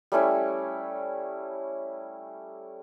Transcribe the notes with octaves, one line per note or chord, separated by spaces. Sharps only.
G3 A3 C#4 E4